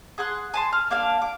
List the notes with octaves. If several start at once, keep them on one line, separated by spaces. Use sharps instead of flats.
G#4 F#5 C6 F#6
G#5 A5 C6
F6
A#3 D4 F5
D6